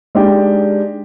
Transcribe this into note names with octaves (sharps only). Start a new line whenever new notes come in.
G#3 D4 D#4 G4